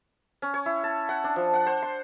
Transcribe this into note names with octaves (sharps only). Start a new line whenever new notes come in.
C#4
C#5
E4
A5
F#5
D4
F3
F#5
C5
C6